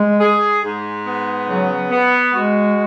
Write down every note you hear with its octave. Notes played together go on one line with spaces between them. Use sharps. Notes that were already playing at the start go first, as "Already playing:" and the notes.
Already playing: G#3
G#4
G#2
B3
C#3 F#3
B3
G#3 F#4